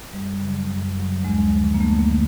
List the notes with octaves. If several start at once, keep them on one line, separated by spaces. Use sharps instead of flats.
F#2 G3
C#3 F#3
F#2
C#3 F#3
D2 G#3
D3 F3
A#3
D2 A3
A#3
D3 F3